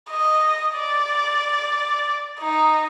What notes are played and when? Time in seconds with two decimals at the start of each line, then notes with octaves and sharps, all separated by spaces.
0.10 D#5
0.76 D5
2.40 D#4